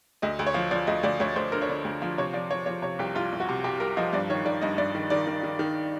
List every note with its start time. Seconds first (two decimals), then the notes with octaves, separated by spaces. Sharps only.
0.22 D2 D#5
0.39 D2
0.47 C#5
0.54 F3
0.71 F3 D5
0.87 D2 D#5
1.03 D2 D5
1.20 D2 C#5
1.36 D2 C5
1.52 D3 A#4
1.62 C#5
1.69 D3 D5
1.85 D2
2.02 F3
2.18 C3 C#5
2.34 F3 D5
2.51 F3 C#5
2.66 F3 C#5
2.82 C3 C#5
2.99 C2 G4
3.15 C2 F4
3.32 C2
3.40 F#4
3.49 C3
3.64 C3 G4
3.80 C2 A#4
3.97 F3 D#5
4.13 G2 D5
4.30 D#3 C#5
4.45 D#3 D5
4.62 G2 D#5
4.78 G2 D5
4.95 D#3
5.10 D#3 D5
5.27 D#3
5.43 D#3
5.59 D#3